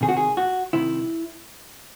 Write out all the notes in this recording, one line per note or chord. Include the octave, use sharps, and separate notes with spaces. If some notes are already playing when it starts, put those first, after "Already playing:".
C2 C3 D#3 G#4
F#4
G#4
F#4
C2 C3 D#3 E4